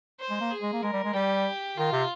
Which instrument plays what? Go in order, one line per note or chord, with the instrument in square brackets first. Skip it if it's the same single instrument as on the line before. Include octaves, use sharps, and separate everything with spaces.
[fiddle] C5
[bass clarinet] G#3
A#3
[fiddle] G#4
[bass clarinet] G#3
A#3
[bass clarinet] G#3 [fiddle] A#4
[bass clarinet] G3
G#3
[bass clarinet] G3 [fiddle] G4
[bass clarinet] D#3 [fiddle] F4
[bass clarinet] C3